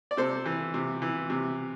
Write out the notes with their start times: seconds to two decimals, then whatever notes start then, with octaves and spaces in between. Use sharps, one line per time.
0.11 D5
0.17 C3 A4 C5
0.46 E3
0.74 C3
1.02 E3
1.30 C3